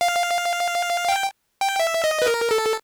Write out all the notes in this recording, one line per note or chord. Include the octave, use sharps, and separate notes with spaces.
F5
G5
G5
E5
D#5
B4
A#4
A4